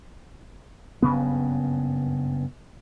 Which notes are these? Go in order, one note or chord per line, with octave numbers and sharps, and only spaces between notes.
F#1 G2 C#3 B3